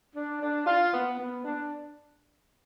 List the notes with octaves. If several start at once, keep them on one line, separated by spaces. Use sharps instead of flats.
D4
D4
F4
B3
B3
D4